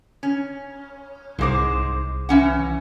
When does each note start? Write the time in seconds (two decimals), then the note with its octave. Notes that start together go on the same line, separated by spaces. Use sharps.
0.23 C#4
1.39 C2 G#2 G#3 C5 D6
2.29 E3 C#4 F#5